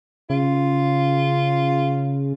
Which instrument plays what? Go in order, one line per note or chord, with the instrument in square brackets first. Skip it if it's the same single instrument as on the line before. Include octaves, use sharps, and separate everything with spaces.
[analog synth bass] C#3 [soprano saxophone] F4